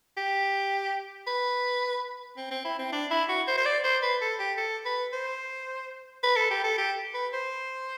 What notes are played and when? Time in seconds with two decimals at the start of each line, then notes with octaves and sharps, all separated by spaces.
0.17 G4
1.27 B4
2.37 C4
2.51 C4
2.65 E4
2.79 C4
2.92 D4
3.10 E4
3.29 F#4
3.47 C5
3.57 C5
3.65 D5
3.84 C5
4.02 B4
4.21 A4
4.39 G4
4.57 A4
4.85 B4
5.13 C5
6.23 B4
6.36 A4
6.50 G4
6.64 A4
6.78 G4
7.14 B4
7.33 C5